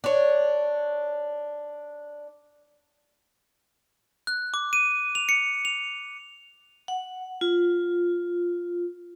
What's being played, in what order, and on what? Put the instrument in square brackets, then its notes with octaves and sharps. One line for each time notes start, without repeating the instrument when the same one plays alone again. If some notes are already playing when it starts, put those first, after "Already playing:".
[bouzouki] D4 C#5
[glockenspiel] F#6
D6
D#7
F7
C#7
F7
[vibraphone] F#5
F4